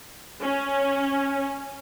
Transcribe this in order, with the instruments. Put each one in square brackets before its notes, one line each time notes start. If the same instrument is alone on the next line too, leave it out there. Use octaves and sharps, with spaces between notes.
[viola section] C#4